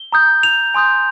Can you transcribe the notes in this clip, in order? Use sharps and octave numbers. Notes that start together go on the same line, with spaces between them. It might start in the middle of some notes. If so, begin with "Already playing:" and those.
Already playing: G7
A#5 D#6 G6
F7
G#5 C6 D#6 G6